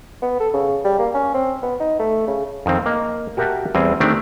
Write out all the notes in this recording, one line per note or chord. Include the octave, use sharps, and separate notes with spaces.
B3
A4
C#3
G3
A#3
C#4
C4
B3
D#4
A3
C#3
F2 D#3 C4
A#3 D#5
F#4 G4 A#4 E5 F#5 A5
E2 G3 C4 G#4
D#3 A3 C4 D4 G4 D5